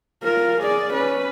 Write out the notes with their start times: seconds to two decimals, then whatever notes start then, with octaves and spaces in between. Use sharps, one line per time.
0.23 F4 A#4
0.61 G#4 D5
0.93 C#4 B4